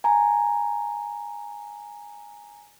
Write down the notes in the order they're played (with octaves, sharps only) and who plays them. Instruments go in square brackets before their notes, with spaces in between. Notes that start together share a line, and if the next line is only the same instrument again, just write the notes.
[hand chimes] G#5 A#5